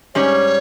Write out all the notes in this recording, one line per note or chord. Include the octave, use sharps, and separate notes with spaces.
G#2 G3 C#4 C#5